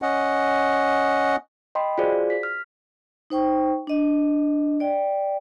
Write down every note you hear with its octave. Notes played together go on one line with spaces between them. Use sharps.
C#4 D#5 F#5
D#5 G5 B5 C6
F4 F#4 G#4 C5 D5
B6
F6
D#4 C5 G5 C#6
D4 D#5
D5 G5